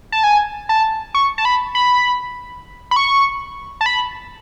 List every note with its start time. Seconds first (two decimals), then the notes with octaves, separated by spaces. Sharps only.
0.12 A5
0.24 G#5
0.69 A5
1.15 C#6
1.38 A5
1.45 B5
1.75 B5
2.91 B5
2.96 C#6
3.81 A5
3.86 B5